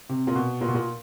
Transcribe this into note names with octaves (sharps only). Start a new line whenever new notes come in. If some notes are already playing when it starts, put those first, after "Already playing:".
C3
A#2
B2
A#2
B2
A#2